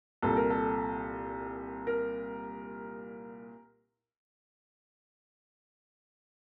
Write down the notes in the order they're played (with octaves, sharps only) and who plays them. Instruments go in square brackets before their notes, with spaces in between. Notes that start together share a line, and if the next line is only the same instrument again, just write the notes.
[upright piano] C2 A#2 A4
A#4
A4
A#4